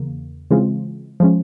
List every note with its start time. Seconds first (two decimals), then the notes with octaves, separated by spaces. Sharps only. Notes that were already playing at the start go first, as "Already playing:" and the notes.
Already playing: E2 C#3 A#3
0.51 C#3 E3 G#3 C4 F4
1.20 F3 G#3 C#4